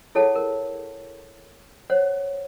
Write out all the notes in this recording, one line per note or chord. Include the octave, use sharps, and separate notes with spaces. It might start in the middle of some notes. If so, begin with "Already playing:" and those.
E4 G#4 A4 C#5 F#5 A5
A#4
C5 C#5 F#5